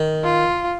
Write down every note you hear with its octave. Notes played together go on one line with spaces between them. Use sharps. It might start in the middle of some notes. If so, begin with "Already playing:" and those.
Already playing: D#3
F4